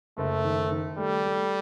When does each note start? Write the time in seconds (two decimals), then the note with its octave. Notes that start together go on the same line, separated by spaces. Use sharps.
0.18 F#1 A3
0.44 D#3
0.72 D#3
0.98 G3 A3
1.25 A3